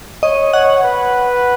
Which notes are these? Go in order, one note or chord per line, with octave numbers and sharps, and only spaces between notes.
C#5 D#5
C#5 F#5
B4